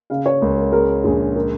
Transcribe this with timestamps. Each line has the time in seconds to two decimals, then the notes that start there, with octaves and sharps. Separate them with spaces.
0.10 C#3 F5
0.26 C#5
0.41 C#2 A#4
0.57 A#4
0.72 G#3 A#4
1.04 A#1 G#4
1.35 A#4